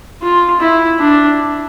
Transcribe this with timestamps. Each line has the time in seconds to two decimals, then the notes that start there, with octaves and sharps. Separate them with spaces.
0.22 F4
0.60 E4
0.99 D4